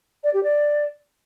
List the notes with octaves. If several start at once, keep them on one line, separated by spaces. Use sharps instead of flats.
D5
G4
D5